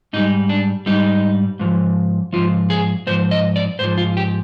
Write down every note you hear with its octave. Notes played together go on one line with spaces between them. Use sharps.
G#2 G3 D#4
D4
G#2 G3 D#4
G#2 F3
G#2 F3 F4
G#4
G#2 F3 C5
D#5
D5
G#2 F3 C5
F4
G4